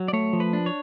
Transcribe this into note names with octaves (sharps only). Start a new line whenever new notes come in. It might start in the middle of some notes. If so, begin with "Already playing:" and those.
Already playing: F#3
D5
A3 C#5
F3
B4
D4
C#5